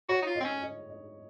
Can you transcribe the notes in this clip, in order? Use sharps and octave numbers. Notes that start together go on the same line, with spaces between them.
F#4 C#5
D#4
F4
C4 D#5
C#4
D#5
D#5